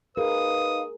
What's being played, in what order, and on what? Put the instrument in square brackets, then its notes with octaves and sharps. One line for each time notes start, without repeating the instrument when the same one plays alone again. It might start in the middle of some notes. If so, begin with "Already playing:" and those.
[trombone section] D#4 B4 [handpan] G#4 A#4 [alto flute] F5 [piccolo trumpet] D#6